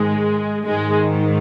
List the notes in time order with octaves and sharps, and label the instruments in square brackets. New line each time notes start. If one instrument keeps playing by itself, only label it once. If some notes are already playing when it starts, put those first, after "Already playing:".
Already playing: [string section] G#2 D#3 G#3
G#2 D#3 G#3